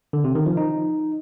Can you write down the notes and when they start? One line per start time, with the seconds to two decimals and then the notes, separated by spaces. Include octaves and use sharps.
0.13 D3
0.24 C3
0.35 D#3
0.46 F3
0.57 D#4